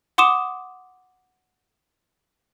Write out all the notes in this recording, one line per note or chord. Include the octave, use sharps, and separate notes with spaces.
F#5 C6 D6 D#6 E7